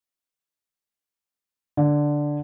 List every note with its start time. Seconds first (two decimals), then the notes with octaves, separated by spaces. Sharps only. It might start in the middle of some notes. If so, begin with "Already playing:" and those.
1.77 D3